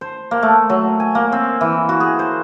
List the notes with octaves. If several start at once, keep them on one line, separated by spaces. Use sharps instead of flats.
C5
A#3
A3
F#3
G#5
A#3
C4
E3
F#4
G#4
C5